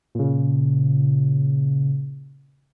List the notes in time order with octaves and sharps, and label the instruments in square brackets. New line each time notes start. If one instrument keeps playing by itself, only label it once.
[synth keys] A#2 C#3